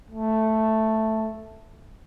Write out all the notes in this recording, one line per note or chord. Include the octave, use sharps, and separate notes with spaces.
A3